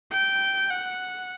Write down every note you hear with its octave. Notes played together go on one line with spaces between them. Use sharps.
G5
F#5